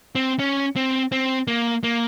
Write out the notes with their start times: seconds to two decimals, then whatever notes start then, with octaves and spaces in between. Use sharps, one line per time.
0.15 C4
0.39 C#4
0.76 C4
1.12 C4
1.48 A#3
1.84 A#3